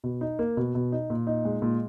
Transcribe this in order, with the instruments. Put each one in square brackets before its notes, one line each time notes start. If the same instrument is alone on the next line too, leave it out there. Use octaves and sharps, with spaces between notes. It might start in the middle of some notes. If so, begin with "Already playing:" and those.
[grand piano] B2
D#4
A#3
B2
B2
D#4
A#2
D#4
G#3
A#2